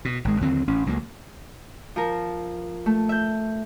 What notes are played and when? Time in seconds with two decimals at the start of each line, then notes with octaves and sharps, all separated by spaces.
0.05 B2
0.25 G#1 G#3
0.41 D#2 D3 F#3 C4
0.67 A1 C#4
0.86 C#2 F#3 A3 A#3
1.96 F3 A#4
2.86 A3
3.09 E5 G6